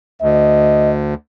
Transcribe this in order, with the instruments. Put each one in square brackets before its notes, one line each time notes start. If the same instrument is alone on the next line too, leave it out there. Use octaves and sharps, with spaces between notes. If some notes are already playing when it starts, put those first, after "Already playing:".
[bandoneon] D2 [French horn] D#5